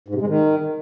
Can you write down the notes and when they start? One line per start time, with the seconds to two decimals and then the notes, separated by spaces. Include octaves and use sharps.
0.08 G#2
0.15 C3
0.21 G#3
0.28 D#3